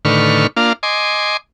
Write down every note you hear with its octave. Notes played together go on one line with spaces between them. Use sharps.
A2 D3 D#3 B4 C#6 F6
A#3 D4 F4 F5
D#5 G#5 C6 D6